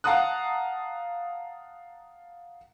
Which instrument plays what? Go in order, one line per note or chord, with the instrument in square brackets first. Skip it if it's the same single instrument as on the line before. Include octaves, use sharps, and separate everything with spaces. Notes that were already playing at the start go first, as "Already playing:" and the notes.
[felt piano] F5 F#5 A5 A#5 D#6 F#6